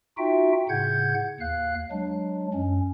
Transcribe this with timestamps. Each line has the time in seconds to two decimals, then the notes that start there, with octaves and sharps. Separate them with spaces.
0.18 D#4 F4 F#4 E5 G5
0.69 A2 C#3 F#5 G6 G#6
1.40 D#2 F5 F#6
1.91 F#3 G#3 D4
2.54 F#2 C#4